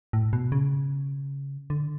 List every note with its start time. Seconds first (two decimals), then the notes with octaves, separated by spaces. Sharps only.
0.13 A2
0.33 B2
0.52 C#3
1.70 D3